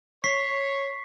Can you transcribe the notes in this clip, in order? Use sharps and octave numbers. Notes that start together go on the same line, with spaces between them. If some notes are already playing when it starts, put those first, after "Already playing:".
C#5 C#6 B6 C7